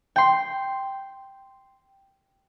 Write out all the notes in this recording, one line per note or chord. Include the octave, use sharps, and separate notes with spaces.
G5 C6